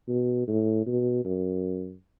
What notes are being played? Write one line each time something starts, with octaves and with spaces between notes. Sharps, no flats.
B2
A2
B2
F#2